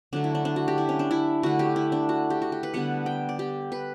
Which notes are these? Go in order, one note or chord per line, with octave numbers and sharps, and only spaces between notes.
D3 F#3 A3 D4
E4
D4
D4
F#4
G4
E4
C#4
D4
E4
D3 A3 F#4
G4
E4
D4
F#4
G4
F#4
G4
B4
D3 G3 B3 F#5
G5
D5
G4
B4